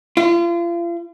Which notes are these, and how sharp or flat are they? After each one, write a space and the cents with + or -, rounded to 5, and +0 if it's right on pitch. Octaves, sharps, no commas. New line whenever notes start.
F4 -35